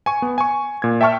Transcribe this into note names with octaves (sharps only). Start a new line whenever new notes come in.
G#5 C#6
B3
G#5 C#6
A#2 G#6
E5 G5 A5 C#6 F6